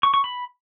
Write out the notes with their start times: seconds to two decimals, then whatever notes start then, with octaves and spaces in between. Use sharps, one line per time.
0.03 C#6
0.14 C#6
0.24 B5